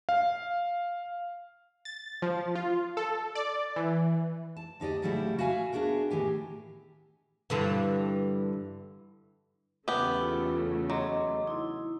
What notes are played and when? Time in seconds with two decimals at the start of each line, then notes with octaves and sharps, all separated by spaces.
0.09 F5
1.85 A6
2.22 F3
2.55 F4
2.97 A4
3.35 D5
3.76 E3
4.57 A5
4.80 D2 D#4 G4 D5 D#5
5.02 A2 C#3 F#3 G3 A3 E4
5.39 F#4 E5 F5 G#5
5.73 B3 D4 F#4 G#4 A#4
6.11 A2 D#3 G4 G#5
7.50 G2 D3 E3
9.88 E2 C#3 A3 B3 G4
10.21 F4
10.90 F#3 D#5 C6 D6
11.47 D#4 E4